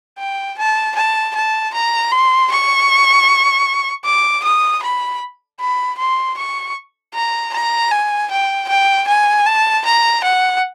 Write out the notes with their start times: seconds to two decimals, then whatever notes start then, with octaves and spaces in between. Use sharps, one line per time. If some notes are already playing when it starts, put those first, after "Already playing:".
0.19 G5
0.58 A5
0.96 A5
1.36 A5
1.74 A#5
2.12 C6
2.52 C#6
4.05 D6
4.44 D#6
4.83 B5
5.60 B5
5.99 C6
6.37 C#6
7.14 A#5
7.54 A#5
7.91 G#5
8.31 G5
8.69 G5
9.08 G#5
9.46 A5
9.85 A#5
10.24 F#5